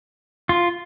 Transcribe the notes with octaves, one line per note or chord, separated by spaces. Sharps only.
F4